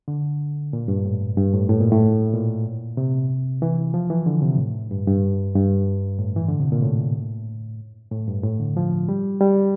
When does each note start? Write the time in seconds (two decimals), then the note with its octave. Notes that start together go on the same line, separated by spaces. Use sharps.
0.08 D3
0.73 A#2
0.88 G2
1.05 A2
1.37 G2
1.54 A2
1.69 A2
1.81 A#2
1.92 A2
2.34 A#2
2.97 C3
3.62 E3
3.94 F3
4.10 E3
4.26 D3
4.42 C3
4.58 A2
4.91 G2
5.07 G2
5.55 G2
6.19 A2
6.36 E3
6.48 D3
6.60 C3
6.72 A#2
6.83 A2
8.11 A2
8.28 G2
8.43 A2
8.59 D3
8.77 F3
9.09 G3
9.40 G3